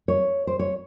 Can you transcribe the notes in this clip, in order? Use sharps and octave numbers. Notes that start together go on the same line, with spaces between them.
C#5
C5
C#5